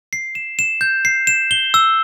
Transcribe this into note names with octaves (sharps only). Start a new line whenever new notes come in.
C7
E7
E7
G6
C7
E7
G7
E6